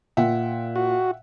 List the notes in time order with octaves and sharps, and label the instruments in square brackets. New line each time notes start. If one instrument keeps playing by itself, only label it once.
[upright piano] A#2 [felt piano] E5 F#5 G5
[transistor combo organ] F#4